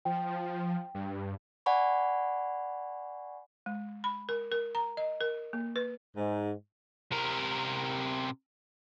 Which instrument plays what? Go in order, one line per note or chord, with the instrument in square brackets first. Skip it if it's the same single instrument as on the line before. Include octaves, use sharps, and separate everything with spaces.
[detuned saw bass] F3 [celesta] G5
[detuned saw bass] G2
[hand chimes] D5 F#5 G#5 B5 C#6
[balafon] G#3
B5
A#4
A#4
A#5
D#5
A#4
A#3
B4
[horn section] G#2
[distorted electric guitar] C3 A#4